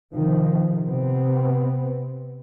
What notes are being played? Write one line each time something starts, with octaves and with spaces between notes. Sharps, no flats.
C3 D#3 F3
C3 B3 C4